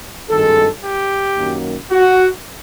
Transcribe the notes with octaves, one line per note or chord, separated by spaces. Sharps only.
G#1 G2 D#3 G#3 A4
G4
F#2 D#3 F#3 A#3
F#4